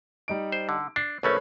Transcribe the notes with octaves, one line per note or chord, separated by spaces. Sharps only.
G3 D#4 D7
C5
D3
D4 C7
A#1 A3 C#4 A4 B4 C#5